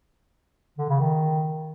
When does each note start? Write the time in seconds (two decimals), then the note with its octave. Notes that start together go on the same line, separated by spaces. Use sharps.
0.78 D3
0.89 C#3
1.00 D#3